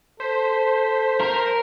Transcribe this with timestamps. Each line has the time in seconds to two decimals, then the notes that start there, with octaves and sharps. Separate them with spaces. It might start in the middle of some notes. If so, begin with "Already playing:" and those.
0.20 A4 C5 B6
1.20 A#4